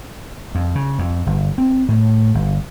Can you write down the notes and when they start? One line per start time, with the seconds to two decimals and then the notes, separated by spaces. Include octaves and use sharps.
0.55 F2
0.75 C#3
0.99 F2
1.27 G1
1.58 C4
1.88 A2
2.35 G1